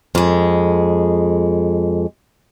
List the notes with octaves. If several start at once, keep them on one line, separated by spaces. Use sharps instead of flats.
F2 G#3